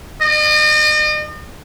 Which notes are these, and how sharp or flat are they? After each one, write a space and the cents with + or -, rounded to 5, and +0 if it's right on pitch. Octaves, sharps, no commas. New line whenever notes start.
D#5 -40